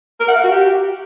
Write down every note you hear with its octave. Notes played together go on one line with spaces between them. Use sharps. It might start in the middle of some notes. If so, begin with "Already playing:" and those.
A#4
F#5
F5
F#4
G4